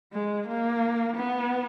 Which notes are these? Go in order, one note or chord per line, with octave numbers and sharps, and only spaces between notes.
G#3
A#3
B3